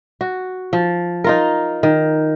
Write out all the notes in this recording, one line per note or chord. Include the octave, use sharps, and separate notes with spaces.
F#4
F3
D#4 F4 A#4
D#3